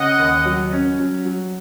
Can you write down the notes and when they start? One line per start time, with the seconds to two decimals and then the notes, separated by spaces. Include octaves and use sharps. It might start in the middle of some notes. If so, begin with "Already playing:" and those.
Already playing: C#3 D#5 F#5
0.19 D#2
0.45 F#3
0.73 C#4
0.99 F#3
1.25 F#3